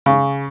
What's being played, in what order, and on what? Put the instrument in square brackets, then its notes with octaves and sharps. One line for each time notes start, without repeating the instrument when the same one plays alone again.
[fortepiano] C#3